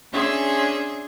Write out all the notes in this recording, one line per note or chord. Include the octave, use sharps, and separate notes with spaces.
C#4 D4 G#4 E5 C6